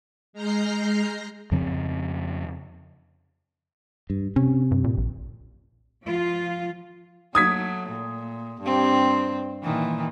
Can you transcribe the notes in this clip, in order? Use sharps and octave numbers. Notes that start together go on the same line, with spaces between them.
G#3 A#5 F6 G6 A#6 C7
F2 C#3 F3 C4
G2
C3 C#4
G2
A#2
A#1
F3 F4
F#3 A3 D#6 G#6 B6
A#2
G2 C4
A#2 D#3 E3